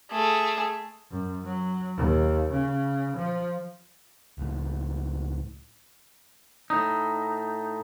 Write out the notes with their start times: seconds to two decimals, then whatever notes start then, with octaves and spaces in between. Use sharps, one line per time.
0.12 A3 G#4
1.11 F#2
1.45 F#3
1.97 D#2
2.51 C#3
3.16 F3
4.38 C#2 A2
6.70 A2 D#4